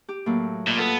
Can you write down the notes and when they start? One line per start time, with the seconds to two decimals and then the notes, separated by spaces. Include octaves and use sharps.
0.09 G4
0.26 A2 F#3 A#3
0.67 A#2 D#5 B5
0.78 B3 F4 A4 D#6